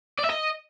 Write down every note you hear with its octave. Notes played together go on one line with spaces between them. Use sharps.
D5
E5
D#5